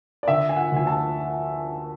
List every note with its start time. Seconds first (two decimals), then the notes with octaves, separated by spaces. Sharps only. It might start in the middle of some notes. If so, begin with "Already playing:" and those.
0.23 D5
0.28 D3 E5
0.49 G#5
0.56 F#5
0.72 D2 G#5
0.87 A5